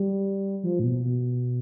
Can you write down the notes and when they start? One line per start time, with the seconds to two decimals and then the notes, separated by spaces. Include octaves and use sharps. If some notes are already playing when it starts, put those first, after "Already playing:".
Already playing: G3
0.63 F3
0.79 A2
0.84 B2
1.04 B2